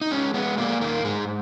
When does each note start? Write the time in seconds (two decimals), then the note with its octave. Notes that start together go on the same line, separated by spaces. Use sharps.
0.01 D#4
0.11 G#3 C#4
0.34 G#3 B3
0.58 A#2 A#3
0.81 D#3 A#3
1.04 G#2 G#3